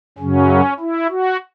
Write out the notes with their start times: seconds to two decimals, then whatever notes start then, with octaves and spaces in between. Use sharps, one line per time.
0.18 F#2 C#3 F#3 C#4
0.79 E4
1.10 F#4